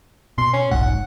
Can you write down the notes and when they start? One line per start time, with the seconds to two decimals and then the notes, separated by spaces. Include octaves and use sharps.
0.38 B2 C6
0.54 C#4
0.71 F1 B1 G#2 F#5